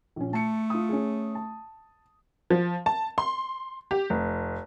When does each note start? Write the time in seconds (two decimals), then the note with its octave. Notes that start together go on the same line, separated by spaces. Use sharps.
0.16 A#1 C#4
0.33 A3 A5 C#7
0.70 F4 D#6
0.89 C#4 G#4
1.35 A5
2.50 F3
2.86 A5
3.18 C6
3.91 G4
4.10 F1